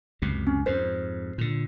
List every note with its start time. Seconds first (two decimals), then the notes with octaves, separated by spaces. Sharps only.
0.22 C#2 F#2 C3
0.47 C#4
0.66 F2 G#2 C5
1.38 A#2 D3